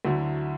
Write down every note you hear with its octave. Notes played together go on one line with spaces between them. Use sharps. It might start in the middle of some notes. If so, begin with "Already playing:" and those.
D2 D3 F#3 A3 E4